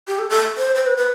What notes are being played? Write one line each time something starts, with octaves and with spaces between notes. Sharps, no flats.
G4
A4
A4
C5
C5
B4
B4